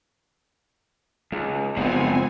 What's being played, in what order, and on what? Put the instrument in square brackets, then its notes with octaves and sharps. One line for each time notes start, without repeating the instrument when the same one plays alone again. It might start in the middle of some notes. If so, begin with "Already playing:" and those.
[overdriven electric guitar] C#2 [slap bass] G#3
[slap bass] F#1 [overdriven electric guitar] G#2 B2 [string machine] F3 G#5 [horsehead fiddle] C4